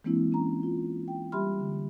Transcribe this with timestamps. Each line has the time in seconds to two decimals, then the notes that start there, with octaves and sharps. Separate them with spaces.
0.04 E3 G#3 A#3 C4 D4 E4
0.32 C#4 A#5
0.63 F4
1.08 G5
1.32 G3 G4 E5 B5 C6 F6
1.59 D3